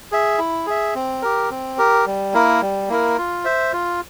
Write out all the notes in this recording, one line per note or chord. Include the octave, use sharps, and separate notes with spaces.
G#4 E5
E4
G#4 E5
C4
G4 A#4
C4
G4 A#4
G3
A#3 E4 A#4
G3
A#3 E4 A#4
F4
C5 E5
F4